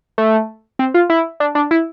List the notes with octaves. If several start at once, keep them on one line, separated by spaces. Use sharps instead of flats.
A3
C4
F4
E4
D4
D4
E4